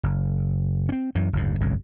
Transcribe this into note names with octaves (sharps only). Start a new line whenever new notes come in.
F#1
C4 C#4
F#2 E3
F#1 D2 G#2
G1 C2 F#2 A2